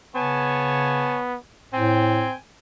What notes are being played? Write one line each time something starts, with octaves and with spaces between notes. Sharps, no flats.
C#3 B3 C#5 G#5 A5
A2 C4 G5 G#5